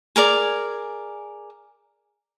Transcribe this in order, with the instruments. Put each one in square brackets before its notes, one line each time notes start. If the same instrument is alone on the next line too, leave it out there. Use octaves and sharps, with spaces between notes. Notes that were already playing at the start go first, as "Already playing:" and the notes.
[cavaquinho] G#4 A#4 D5 G#5